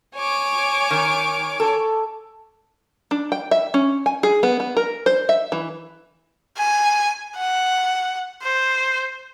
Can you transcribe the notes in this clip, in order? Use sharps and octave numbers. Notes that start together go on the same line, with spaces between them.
C#5 G#5 D6
D#3
A4
D4
G5
E5
C#4
G#5
G#4
B3
B3
A#4
C5
E5
E3
G#5
F#5
C5